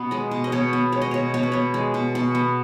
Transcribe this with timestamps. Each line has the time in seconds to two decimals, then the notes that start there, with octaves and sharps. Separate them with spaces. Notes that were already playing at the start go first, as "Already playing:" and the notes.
Already playing: B2 B3
0.11 G#3 D#5
0.31 B2
0.44 D#5
0.52 B2 C#5
0.73 B3
0.92 G#3 C#5
1.01 D#5
1.11 B2 C#5
1.34 B2 C#5
1.43 B4
1.52 B3 C#5
1.74 G#3
1.94 B2
2.15 B2
2.35 B3